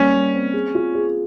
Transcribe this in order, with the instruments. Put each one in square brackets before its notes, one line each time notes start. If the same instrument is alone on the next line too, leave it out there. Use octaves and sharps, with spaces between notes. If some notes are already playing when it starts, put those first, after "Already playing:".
Already playing: [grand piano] G3 A#3 [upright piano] C#4
[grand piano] G3
C4
G#4
F4
G#4